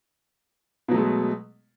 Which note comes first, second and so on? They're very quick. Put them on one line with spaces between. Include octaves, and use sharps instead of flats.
B2 F#3 A3 G#3